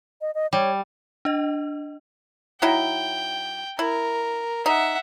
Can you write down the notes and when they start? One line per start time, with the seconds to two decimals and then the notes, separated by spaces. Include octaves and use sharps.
0.21 D#5
0.35 D#5
0.53 G3 C#5
1.25 D4 D#5
2.62 F#3 D#4 E4 G5
3.79 E4 A#4
4.66 D#4 E5 F#5